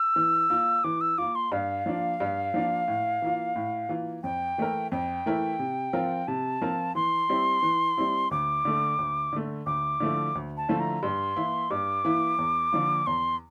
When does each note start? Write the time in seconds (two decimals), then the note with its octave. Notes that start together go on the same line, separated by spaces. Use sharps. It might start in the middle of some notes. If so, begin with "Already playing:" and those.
Already playing: E6
0.16 E3
0.50 A#3 F4
0.84 E3 D6
1.01 E6
1.18 A#3 F4 D6
1.35 C6
1.52 G2 F5
1.86 F3 A#3 D4 F4
2.20 G2
2.54 F3 A#3 D4 F4
2.88 A2
3.22 E3 A#3 F4
3.56 A2
3.89 E3 A#3 F4
4.23 F2 G5
4.58 E3 A3 E4 A#4
4.92 F2 G5
5.26 E3 A3 E4 A#4
5.59 C3
5.93 F3 C4 F4 A#4
6.28 C3 A5
6.62 F3 C4 F4 A#4
6.95 E3 C6
7.29 G3 C4 E4
7.63 E3
7.97 G3 C4 E4
8.31 D2 D6
8.65 D3 A3
8.99 D2
9.33 D3 A3
9.66 D2 D6
10.00 D3 F3 A3 E4
10.35 D2
10.57 A5
10.69 D3 F3 A3 E4
10.80 A#5
11.03 G2 C6
11.36 E3 A#3 E4
11.71 G2 D6
12.05 E3 A#3 E4
12.38 E2
12.72 D3 F3 A#3
13.07 E2 C6